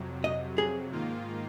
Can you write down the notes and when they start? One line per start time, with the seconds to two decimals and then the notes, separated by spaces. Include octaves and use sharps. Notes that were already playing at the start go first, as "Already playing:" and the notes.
Already playing: F2 C3 F#3
0.24 D#5
0.58 G#4
0.91 G#2 D#3 A#3 F4